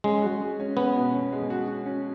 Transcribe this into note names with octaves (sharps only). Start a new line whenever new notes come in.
G#3 C#4
F#4
G#3
C#4
B3 C#4
B2
C#4
G#3
F#4
F#4
C#4